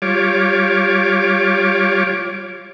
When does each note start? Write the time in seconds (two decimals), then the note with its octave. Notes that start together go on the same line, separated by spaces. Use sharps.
0.02 G3 F4 C#5 D6